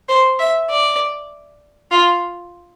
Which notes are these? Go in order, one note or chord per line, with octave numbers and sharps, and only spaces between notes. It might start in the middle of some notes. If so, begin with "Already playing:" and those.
C5
E5
D5
F4